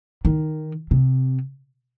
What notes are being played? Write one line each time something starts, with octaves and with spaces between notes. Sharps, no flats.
D#3
C3